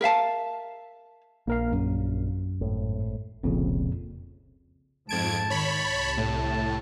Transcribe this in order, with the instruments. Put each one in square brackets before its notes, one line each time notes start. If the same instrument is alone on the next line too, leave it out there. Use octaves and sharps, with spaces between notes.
[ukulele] A#4 E5 F5 A5
[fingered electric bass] A#1 [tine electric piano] A#3 A#4 F5
[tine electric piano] F#2
[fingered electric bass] G#1 A2
[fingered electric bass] F1 C2 [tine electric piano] F2 A#2 C#3
[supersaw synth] F2 G#6 D7 [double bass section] G#2 F3 [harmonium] A5
[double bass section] D#3 [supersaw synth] C#5 B5
[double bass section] C2
[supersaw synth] A2